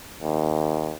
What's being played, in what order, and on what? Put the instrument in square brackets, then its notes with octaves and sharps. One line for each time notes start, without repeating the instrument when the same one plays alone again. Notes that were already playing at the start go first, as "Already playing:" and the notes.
[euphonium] D#2